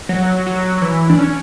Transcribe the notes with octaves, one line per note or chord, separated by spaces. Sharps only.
F#3
F#3
F#3
E3
D4
C#4